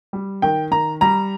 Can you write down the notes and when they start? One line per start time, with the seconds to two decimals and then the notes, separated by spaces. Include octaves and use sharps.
0.13 G3
0.42 D#3 G5
0.71 D#3 A#5
1.01 G3 A#5